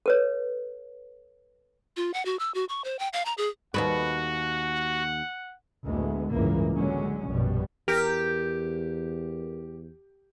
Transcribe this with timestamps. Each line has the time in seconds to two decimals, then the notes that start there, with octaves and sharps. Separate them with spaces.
0.06 A4 B4 C#5
1.97 F4
2.14 F#5
2.25 F#4
2.39 E6
2.54 F#4
2.69 C#6
2.84 C5
2.99 G5
3.13 F5
3.25 A#5
3.38 G#4
3.74 D#2 G#2 F#4 B4 F#5
5.83 D2 A2 G#3 B3
6.32 G1 C#2 A2 E3 A#3
6.75 D3 F#3 G#3 C#4
7.27 A#1 F#2 B2 G3
7.88 E2 G4 A#4